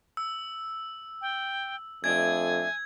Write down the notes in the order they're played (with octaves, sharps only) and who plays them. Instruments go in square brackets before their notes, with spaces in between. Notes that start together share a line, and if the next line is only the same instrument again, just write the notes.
[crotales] E6
[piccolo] G5
[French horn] F2 [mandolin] A3 D4 D#5 [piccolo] G#5 [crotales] G#6